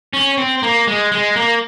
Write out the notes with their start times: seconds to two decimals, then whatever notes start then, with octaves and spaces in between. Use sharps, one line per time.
0.13 C#4
0.38 C4
0.63 A#3
0.87 G#3
1.12 G#3
1.36 A#3